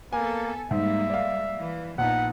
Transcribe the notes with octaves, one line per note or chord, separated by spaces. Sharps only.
A#3 B3 A4 G#5
G#2 G3 G#3 A#3 E5
D5 F5
E3
A#1 B3 D#4 F#5